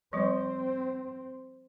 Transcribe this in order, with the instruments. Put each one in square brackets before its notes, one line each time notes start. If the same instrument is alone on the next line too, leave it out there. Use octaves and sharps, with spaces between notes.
[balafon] F3 G3 C#6 [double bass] C4